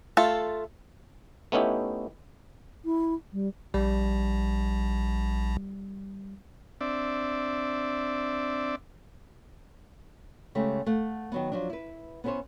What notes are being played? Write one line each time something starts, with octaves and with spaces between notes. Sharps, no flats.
A3 F4 A4
A3 B3 C#4 D#4 E4 G4
E4
G3
A#1 G3
C4 D4 D5 E5
C#3 G#3 A3 G4
A3 F5 F#5
D#3 F#3 B3
F3 F#3 D4
E4 B4
B3 C#4 E4 A#4 C5 C#5